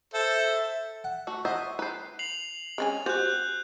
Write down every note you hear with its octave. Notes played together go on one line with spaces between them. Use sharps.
A4 C5 E5
F#5
A3 F#4
F#4 C5 D#5 E5
B4 C5
C7 F7 F#7
G#3 C#4 G#5
F#4 G4 C5 F#6 G6